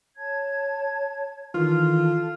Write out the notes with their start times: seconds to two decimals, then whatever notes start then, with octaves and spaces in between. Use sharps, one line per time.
0.16 C#5 A5 G#6
1.54 D#3 E3 F4 A4